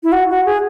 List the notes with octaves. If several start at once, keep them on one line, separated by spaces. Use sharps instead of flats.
E4
F#4
F#4
G#4